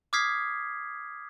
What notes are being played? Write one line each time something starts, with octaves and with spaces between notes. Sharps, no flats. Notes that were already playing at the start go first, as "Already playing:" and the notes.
D6 D#6 F6 G#6 B6 C7